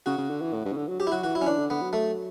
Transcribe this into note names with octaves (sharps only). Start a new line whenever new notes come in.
C#3 F#4
C#3
D3
E3
A2
G2
C#3
D3
F#3
F#3 G4
E4
F#3 F#4
E3 F#4
F#3 E4
C#4
E3 D4
D3
D3 B3
F#3
A3